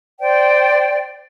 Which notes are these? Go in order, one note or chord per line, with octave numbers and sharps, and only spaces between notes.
C5 D5 G5